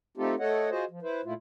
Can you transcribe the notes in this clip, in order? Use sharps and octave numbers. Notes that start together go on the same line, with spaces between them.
A3 C4 D#4 F4 G4 A4
A3 A4 C#5 D#5 F#5
F4 F#4 G#4 C5 D#5
F3
E4 B4 C5
A#2 A3 E4 F4